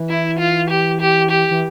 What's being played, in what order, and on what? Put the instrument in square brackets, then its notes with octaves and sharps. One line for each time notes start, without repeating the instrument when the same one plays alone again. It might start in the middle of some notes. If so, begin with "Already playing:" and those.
Already playing: [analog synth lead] E3
[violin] E4
F4
G4
G4
G4
[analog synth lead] E3